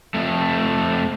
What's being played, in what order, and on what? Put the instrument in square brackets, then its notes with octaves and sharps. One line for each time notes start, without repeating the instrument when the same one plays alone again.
[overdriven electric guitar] F2 A3